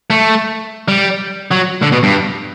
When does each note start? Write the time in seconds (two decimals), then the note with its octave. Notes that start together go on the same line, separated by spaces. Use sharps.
0.10 A3
0.88 G3
1.51 F#3
1.82 D3
1.92 B2
2.03 G2